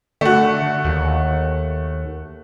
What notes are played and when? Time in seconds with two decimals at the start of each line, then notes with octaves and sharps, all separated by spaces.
0.21 D3 A3 F#4
0.84 D#2